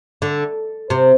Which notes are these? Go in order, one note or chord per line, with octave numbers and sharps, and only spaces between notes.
D3
C3